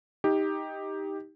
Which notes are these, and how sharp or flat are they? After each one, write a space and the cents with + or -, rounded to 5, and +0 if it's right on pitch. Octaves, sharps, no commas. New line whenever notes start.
D#4 +15 G4 +10